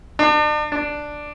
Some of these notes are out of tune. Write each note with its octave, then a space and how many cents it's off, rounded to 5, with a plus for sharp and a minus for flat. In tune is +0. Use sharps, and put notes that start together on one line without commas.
D4 +40
D4 +5